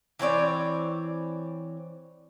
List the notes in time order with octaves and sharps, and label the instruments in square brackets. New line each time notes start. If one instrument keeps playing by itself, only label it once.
[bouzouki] E3 C4 C#5 D5